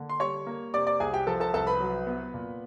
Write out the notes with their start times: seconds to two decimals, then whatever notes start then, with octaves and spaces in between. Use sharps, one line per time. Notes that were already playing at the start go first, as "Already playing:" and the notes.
Already playing: D3 A#3
0.09 C6
0.20 G3 C#5 C#6
0.47 A#3
0.74 C3 D5 D6
0.87 D5 D6
1.00 C2 G#4 G#5
1.14 G4 G5
1.27 F3 A4 A5
1.40 A4 A5
1.54 C2 A4 A5
1.67 B4 B5
1.80 F#3
2.07 B3
2.34 A#2